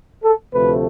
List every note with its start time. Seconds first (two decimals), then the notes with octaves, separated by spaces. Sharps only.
0.24 A4
0.54 D2 C3 F3 A3 B4